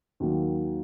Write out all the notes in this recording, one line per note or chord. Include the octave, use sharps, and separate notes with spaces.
D#2 D#3 F#3 A#3